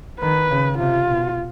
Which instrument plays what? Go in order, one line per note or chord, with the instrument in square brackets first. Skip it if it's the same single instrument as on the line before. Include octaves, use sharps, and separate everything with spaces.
[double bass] D#3 [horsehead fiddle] B4
[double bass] C#3
[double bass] C3 [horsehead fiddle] F4
[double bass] B2